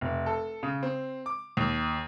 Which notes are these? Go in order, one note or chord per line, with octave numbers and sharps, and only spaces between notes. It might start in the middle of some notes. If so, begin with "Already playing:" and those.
F1
A4
C#3
C4
D6
D#2